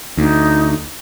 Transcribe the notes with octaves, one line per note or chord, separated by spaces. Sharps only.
D2 D#4